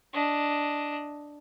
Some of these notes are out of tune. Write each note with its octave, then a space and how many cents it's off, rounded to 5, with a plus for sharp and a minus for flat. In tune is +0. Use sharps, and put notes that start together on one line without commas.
D4 +0 D#5 +5